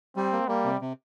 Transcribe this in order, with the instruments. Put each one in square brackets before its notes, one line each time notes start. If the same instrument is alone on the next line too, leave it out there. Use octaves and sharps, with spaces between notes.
[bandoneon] G3 [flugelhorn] C4
[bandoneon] A#3
[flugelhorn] G3 [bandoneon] A#3
[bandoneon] C3
C3